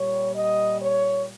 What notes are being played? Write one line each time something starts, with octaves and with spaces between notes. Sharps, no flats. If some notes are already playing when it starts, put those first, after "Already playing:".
Already playing: A#2 G3 C#5
D#5
C#5